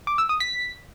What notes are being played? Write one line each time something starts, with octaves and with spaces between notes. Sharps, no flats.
D6
E6
D#6
B6